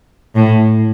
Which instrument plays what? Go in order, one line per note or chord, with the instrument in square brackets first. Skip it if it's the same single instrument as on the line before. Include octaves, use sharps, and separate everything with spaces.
[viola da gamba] A2